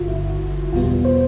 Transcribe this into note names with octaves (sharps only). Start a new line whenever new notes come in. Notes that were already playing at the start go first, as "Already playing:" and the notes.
Already playing: G1 G2 D3 F4 F#4
E4
E2 B2 G3 B3 F4
C5